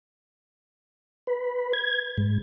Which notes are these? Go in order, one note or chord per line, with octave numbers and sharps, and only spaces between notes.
B4
G#6
G#2